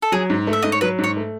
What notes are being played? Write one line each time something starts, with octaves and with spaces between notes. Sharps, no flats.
A4
F#3 G#4
G#2
A3
E5
G#2 D#5
C#5
F#3 B4
G#2
C#5
A3